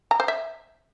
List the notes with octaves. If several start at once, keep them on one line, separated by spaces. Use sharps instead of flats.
A#5
C5
E5